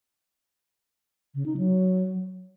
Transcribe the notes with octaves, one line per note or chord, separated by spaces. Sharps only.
C#3
D#4
F#3